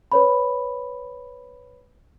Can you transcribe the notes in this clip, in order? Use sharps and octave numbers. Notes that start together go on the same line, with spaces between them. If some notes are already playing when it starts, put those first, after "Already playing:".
B4 C#5 B5